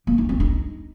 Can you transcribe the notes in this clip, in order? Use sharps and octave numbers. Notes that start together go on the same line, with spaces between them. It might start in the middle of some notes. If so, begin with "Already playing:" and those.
A#3
D#4
C4
D#4